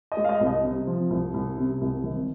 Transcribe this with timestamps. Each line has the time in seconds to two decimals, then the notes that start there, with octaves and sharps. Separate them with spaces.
0.12 D#5
0.17 G#3
0.24 F5
0.29 D#5
0.41 C2
0.47 D#5
0.64 C3
0.87 F3
1.10 C2
1.34 C2
1.57 C3
1.81 C2
2.04 G#1